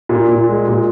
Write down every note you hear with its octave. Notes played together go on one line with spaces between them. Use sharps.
A#2
A#2
G#3
A#2